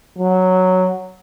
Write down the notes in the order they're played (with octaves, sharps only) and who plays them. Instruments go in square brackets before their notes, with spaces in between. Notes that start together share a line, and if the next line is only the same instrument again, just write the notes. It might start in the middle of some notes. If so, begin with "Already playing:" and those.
[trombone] F#3